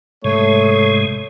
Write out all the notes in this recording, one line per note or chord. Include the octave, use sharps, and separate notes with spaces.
G#2 C3 G#3 A3 C#5